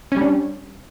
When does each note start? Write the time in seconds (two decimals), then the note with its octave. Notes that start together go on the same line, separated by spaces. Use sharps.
0.12 C#4
0.17 G3
0.21 D4